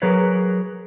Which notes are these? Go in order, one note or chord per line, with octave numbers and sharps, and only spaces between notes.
F#3 G#4 A#4 B4 C#5